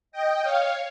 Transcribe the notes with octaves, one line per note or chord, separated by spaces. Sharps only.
D#5 G5
C#5 F5